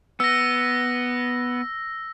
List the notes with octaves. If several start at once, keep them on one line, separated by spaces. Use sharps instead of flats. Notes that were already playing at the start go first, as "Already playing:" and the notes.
B3 E6 A#6